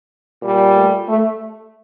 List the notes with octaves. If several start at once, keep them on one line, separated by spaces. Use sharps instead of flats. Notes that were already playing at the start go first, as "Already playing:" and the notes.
A#2 G3
A3
A3